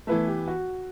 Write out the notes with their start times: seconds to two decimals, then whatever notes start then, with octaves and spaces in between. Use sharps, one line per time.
0.07 E3 A3 B3 E4 B4 E5
0.28 G4
0.47 F#4